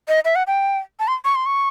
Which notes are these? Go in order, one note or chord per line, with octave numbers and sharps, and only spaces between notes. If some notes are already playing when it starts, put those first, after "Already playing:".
D#5
E5
F#5
G5
A5
C6
C#6
C6
C#6